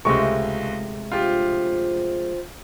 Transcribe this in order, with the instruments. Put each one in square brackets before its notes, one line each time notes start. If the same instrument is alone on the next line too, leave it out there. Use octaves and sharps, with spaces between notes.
[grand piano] C#2 C#6 [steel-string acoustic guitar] C3 G#3 A3
[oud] F3 D4 [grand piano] F4 G4